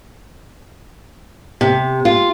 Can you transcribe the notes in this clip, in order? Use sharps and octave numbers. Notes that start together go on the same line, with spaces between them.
C3
F4